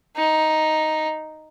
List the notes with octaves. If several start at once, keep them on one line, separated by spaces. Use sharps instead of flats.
D#4